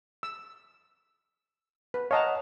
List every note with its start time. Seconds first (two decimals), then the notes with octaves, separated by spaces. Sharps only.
0.23 E6
1.94 B4
2.11 C#5 D#5 F5 F#5 A5 A#5